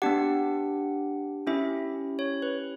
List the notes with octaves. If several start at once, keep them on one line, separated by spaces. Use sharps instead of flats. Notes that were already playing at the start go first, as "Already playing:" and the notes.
B3 D4 G4 F#5
C#4 E4 G4 E5
C#5
B4